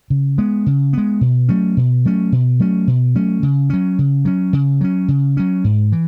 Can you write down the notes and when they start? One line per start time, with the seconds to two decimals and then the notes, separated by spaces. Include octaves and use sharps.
0.10 C#3
0.38 G#3 B3
0.66 C#3
0.93 G#3 B3
1.21 B2
1.49 F#3 A3 C#4
1.77 B2
2.05 F#3 A3 C#4
2.32 B2
2.60 F#3 A3 C#4
2.87 B2
3.15 F#3 A3 C#4
3.43 C#3
3.70 F#3 C#4
3.99 C#3
4.25 F#3 C#4
4.53 C#3
4.81 F#3 C#4
5.08 C#3
5.37 F#3 C#4
5.64 G#2
5.92 E3